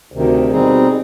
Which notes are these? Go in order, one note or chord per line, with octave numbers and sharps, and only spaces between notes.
D2 C3 D#3
B2 G3 C4 D#4 G#4